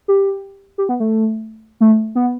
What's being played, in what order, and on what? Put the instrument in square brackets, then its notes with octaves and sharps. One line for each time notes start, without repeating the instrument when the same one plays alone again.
[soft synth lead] G4
G4
B3
A3
A3
B3